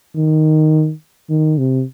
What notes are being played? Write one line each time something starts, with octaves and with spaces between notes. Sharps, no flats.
D#3
D#3
C3